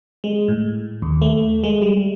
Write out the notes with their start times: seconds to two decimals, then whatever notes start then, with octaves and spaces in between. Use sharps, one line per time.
0.24 G#3
0.48 A2
1.02 D#2
1.22 A3
1.64 G#3
1.82 G3